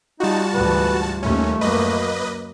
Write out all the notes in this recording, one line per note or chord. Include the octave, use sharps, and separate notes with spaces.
G3 D#4 F4 F#4 A5
D2 G#2 E3 B4
D#2 A3 C#4
F#2 A#3 B4 D#5